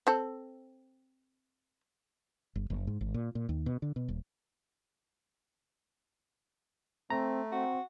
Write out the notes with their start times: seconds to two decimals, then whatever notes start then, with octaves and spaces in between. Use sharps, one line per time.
0.07 C4 A4
2.56 G1
2.70 F#1
2.87 G#2
3.01 G#1
3.14 A#2
3.35 A#2
3.49 D#2
3.66 B2
3.82 D3
3.96 B2
4.09 D#1
7.10 A3 C4 A#5
7.52 C4 F#4